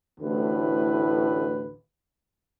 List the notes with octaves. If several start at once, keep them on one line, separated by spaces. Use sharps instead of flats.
A1 D2 A2 B4